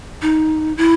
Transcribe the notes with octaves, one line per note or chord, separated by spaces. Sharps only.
D#4
E4